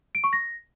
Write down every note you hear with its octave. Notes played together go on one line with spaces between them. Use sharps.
D7
C#6
A#6